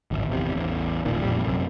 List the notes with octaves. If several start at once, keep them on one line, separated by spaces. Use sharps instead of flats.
D1 G#1
G#1 E2 C3
A1 E2
E1 A#2 D#3
A#1 F2 A#2 G3
F#2 C3